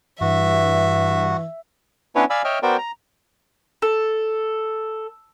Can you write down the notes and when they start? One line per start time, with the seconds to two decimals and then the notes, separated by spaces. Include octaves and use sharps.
0.21 G2 E3 F#4 E5
2.16 B3 C#4 D4 E4 B4 C#5
2.30 D5 F5 G#5 B5 E6
2.44 C#5 D#5 E5 G5 F6
2.63 B3 F#4 A#4 C5 D5 G5
2.78 A#5
3.82 A4